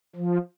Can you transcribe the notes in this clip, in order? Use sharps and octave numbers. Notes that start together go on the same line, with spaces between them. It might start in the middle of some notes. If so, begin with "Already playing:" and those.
F3